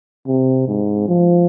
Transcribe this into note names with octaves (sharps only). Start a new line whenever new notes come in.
C3
G#2
F3